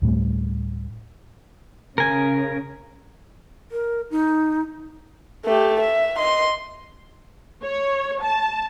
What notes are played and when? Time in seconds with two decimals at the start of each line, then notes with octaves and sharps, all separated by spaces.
0.02 D2 A2 G3 A3
1.98 C#3 A#4 G#5
3.72 A#4
4.11 D#4
5.45 A3 G4
5.80 E5
6.18 D#5 C6
7.63 C#5
8.23 A5